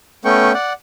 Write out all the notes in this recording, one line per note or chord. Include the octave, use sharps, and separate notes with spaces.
A3 B3 C#4 G5 C#6
D5 F#5